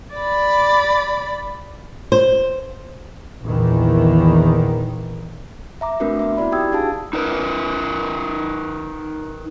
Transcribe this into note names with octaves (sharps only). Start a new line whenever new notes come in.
D5 B5
C5
A#1 E2 D#3 E3
E5 A#5 D6
A3 C4 D4 F#4 A#4 B4
B3 E5 D6
E4 F#4 D5 B5
D#4 G4 G5 D#6 E6 G#6
D4 F#4 G#4 F5 A5
D#4 A#4 B4